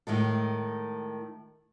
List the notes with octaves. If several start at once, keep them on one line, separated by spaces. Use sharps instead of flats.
A2 D#3 G#3 A4